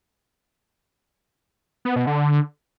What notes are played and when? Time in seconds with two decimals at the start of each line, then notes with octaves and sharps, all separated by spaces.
1.85 B3
1.96 B2
2.07 D3